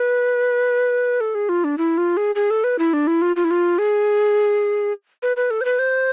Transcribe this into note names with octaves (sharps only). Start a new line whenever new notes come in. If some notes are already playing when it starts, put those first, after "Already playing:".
Already playing: B4
A4
G#4
F4
D4
E4
F4
G#4
G#4
A4
B4
E4
D4
E4
F4
F4
E4
F4
G#4
B4
B4
A4
C5
B4
C5